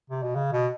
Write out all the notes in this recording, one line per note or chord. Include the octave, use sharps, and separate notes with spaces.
C3
B2
C#3
B2